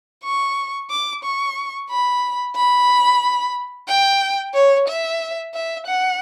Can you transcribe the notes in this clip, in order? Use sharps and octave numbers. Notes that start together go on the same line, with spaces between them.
C#6
D6
C#6
B5
B5
G5
C#5
E5
E5
F#5